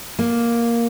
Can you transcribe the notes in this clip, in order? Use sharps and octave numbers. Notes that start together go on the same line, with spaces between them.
A#3